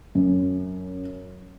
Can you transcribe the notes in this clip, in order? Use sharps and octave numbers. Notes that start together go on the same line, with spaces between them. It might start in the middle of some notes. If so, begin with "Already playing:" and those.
F#2